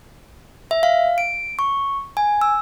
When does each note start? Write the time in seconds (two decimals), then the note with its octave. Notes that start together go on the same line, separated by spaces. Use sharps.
0.71 E5
0.83 F5
1.18 D7
1.59 C#6
2.17 G#5
2.41 E6